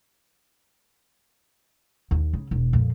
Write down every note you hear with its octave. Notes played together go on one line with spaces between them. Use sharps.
D#2
C#3
E1
F2 A#2